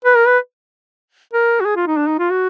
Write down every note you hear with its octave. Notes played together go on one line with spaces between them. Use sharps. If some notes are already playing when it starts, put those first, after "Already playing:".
B4
A#4
B4
A#4
F#4
G#4
F4
D#4
D4
D#4
F4
F#4